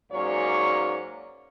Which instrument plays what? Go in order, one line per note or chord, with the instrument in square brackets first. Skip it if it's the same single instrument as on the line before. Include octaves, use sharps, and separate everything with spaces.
[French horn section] G#2 F#3 A#3 C#4 C#5 D5